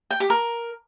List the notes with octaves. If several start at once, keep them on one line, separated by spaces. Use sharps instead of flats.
G5
G4
A#4